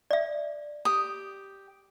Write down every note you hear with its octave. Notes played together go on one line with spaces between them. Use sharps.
D5 E5
G4 D#6